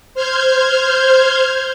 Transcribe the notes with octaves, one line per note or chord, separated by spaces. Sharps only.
C5 F6 G6 G#6